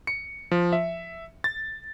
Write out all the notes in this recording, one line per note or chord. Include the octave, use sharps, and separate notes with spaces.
C#7
F3
E5
A6